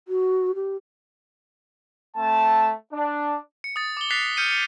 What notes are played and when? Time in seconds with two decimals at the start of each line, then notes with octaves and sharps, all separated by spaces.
0.08 F#4
0.55 G4
2.17 A3 C4 A5
2.93 D4
3.64 C#7
3.76 D#6 A6
3.97 D6 G7
4.11 F#6 A6 B6 C7 F7
4.37 F6 G6 C#7 D#7
4.51 C#7